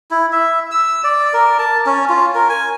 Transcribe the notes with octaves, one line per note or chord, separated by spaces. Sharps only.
E4
E5
E6
D5
A#4
A5
C#4
F4
A#4
G#5